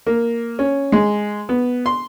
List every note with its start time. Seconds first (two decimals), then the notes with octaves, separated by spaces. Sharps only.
0.07 A#3
0.59 C#4
0.92 G#3
1.49 B3
1.86 C6